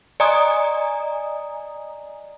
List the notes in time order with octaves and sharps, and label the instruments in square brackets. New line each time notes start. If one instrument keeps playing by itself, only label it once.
[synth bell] D5 D#5 G#5 A#5 D#6